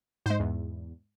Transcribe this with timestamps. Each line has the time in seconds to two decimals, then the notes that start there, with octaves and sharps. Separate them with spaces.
0.26 G#2 G#3 C5
0.40 E2